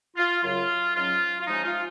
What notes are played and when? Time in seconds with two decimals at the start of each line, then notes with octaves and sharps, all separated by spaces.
0.17 F4
0.42 F#2 C#3 F#3 F4
0.95 G#2 F#3 C#4 F4
1.40 F4
1.47 C3 F3 G#3 C#4 D#4
1.64 F4